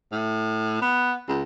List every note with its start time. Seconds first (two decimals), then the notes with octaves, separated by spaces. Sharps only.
0.12 A2
0.81 B3
1.28 C#2